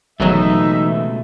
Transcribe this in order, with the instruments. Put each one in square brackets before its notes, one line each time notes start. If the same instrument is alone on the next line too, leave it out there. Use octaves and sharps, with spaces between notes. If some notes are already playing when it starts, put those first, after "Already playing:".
[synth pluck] G#1 F#3 [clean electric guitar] C#2 B2 A3 [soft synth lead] E3 [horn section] D#4 E5